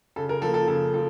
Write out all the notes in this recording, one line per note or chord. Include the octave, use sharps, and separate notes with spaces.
C#3 A4
A#4
F3 A#3 A4
A4
C#3 A4
F3 A4